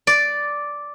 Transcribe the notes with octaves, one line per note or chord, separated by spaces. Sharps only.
D5